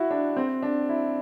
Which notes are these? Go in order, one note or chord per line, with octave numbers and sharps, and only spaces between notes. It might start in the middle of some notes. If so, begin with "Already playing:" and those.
Already playing: E4 F#4
D4
C4
D4
E4